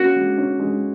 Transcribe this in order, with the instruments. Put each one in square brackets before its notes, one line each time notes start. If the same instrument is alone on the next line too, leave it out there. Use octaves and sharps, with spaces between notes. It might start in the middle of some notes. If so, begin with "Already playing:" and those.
Already playing: [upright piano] A#3 C#4 [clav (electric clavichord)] F#4
[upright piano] G#3
C#4
G#3